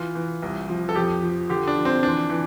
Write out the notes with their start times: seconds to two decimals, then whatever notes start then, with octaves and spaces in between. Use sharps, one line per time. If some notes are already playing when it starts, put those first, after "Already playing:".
Already playing: E3 F4
0.15 E3
0.43 C2
0.69 F3
0.89 A4
0.95 F2 G4
1.23 F3
1.50 D3 G4
1.67 D4
1.76 F3
1.85 C4
2.03 E3 D4
2.30 E3